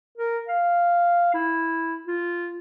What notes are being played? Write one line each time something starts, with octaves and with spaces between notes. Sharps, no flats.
A#4
F5
E4
F4